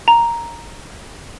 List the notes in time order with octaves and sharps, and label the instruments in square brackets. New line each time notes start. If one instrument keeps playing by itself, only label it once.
[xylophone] A#5